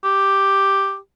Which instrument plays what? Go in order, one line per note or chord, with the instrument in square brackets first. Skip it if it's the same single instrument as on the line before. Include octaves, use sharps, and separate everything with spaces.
[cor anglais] G4